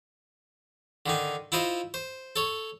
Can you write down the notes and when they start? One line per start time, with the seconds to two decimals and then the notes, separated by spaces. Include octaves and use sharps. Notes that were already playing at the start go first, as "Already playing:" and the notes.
1.06 D3 D#3 D#4
1.52 E4 F4 C5 D#5
1.94 C5
2.36 A4 C#5